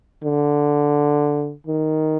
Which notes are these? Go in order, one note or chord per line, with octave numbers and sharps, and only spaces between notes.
D3
D#3